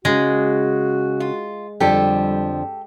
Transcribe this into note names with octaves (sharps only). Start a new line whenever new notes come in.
C#3 G#3 F#4
F4
F2 D3 F3 G3 G4 A4